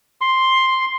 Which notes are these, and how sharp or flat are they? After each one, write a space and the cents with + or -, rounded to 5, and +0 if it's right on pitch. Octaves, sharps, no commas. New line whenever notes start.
C6 +5